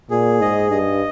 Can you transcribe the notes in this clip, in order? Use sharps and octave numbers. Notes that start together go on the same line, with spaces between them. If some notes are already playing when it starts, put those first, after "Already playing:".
A#2 G#4
G#2 D#5
G2 D#5